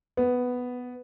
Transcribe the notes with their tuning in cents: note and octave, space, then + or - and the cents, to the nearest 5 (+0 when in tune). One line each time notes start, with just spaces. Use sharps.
B3 +5